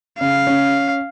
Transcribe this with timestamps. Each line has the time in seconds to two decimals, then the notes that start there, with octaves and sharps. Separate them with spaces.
0.20 C#3 F5
0.47 C#4